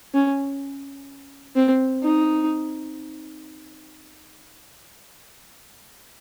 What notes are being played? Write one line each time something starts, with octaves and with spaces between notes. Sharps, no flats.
C#4
C4
D#4